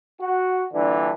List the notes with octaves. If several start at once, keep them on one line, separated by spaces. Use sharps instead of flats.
F#4
G2 A#2 D3 E3 D4